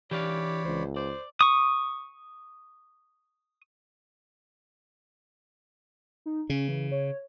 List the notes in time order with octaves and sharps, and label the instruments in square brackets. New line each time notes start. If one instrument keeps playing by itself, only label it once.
[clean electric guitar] E3 D4 F5 [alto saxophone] G4 [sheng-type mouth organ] C#5 D5 B5
[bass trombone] C#2 [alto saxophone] C5
[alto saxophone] C5 [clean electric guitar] D5
[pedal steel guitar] C#6 D#6
[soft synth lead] D#4
[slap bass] C#3 [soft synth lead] C#4
[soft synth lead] E3
C#5